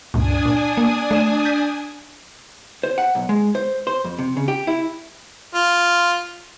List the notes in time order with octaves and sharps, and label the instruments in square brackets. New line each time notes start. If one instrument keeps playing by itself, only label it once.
[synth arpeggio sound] C#2 G2 A#2 [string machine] D4 G#5 D#6
[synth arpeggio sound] A#2
A#3
A3 D5 E7
G6 A6 B6
[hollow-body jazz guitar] C5
F#5
B1
G#3
C5
C5
F2
C3
C#3
G4
E4
[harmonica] F4